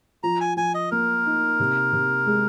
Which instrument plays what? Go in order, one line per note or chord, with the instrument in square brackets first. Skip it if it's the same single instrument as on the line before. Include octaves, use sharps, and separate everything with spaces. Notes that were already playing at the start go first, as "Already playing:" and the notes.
[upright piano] F3 [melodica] A#5
[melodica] G#5
[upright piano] F3 [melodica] G#5
[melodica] D#5
[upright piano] A#3 [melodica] A#4
[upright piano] D#4
C3
C3
G#3